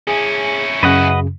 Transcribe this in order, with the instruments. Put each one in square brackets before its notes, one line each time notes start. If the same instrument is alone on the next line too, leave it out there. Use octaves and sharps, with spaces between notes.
[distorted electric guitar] C#4 E4 [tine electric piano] G#4 G#5
[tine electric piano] F#2 C#3 [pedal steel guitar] B4 D#5 F#5